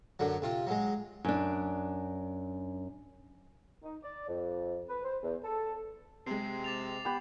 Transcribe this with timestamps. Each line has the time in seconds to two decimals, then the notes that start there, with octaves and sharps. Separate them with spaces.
0.19 F#2 D3 F#3
0.42 C3 F4
0.67 F#3 G#3
1.25 F#2 D4
3.83 D#4
4.03 D5
4.28 F2
4.89 B4
5.05 C5
5.23 E2
5.44 A4
6.26 C3 G#3 C4 C7
6.64 D6 A6 F7
7.05 B3 G4 B5